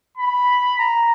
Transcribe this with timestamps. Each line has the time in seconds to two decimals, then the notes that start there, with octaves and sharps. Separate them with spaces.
0.17 B5
0.79 A#5